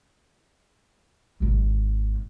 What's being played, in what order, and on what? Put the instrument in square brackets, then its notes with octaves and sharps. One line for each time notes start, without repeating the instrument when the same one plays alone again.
[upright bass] G#1 D#2